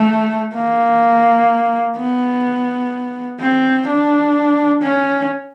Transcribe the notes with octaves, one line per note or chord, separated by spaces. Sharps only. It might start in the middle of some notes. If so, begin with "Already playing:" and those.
Already playing: A3
A#3
B3
C4
D4
C#4